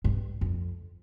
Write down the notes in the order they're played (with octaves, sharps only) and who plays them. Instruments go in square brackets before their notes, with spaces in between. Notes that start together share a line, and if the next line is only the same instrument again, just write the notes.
[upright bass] G2
F2